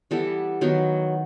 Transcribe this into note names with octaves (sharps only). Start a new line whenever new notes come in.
E3 G3 B3 A4
D#3 F#3 B3